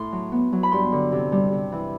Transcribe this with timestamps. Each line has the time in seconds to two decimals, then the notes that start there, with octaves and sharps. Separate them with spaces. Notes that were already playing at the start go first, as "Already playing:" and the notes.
Already playing: A2 C6
0.12 F#3
0.32 B3
0.53 F#3
0.63 B5
0.72 G2 C6
0.92 D3
1.12 C3
1.32 G3
1.53 C3
1.72 E3